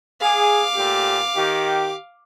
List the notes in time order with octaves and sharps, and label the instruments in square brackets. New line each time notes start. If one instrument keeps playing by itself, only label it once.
[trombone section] G#4 [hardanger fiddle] F5 D6
[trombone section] A#2 A3 G4
D#3 G4